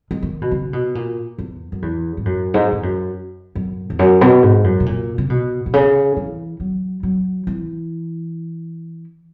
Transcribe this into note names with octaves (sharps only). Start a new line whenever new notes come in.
G#3
D#3
B2
C#3
B2
A#2
E2
F#2
E2
G#2
F#2
G#2
G#2
F#2
F#2
E2
F#2
B2
G#2
F#2
B2
A#2
C#3
B2
B2
C#3
E3
F#3
F#3
E3